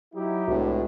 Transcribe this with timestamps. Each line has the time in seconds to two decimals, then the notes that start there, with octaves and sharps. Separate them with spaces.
0.14 F#3 D#4 E4 G4
0.48 C2 A2 G#3 B3 D4 F#4